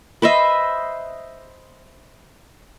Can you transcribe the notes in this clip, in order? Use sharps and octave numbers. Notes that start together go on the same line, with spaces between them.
B4 C5 D#5 E5